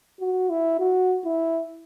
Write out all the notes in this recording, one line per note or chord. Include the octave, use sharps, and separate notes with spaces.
F#4
E4
F#4
E4